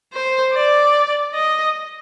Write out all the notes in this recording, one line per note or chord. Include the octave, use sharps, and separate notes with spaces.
C5
D5
D#5